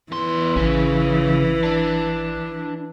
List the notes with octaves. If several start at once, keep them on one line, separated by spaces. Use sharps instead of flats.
E2 E3 C6
A1 C#3 C#4
D4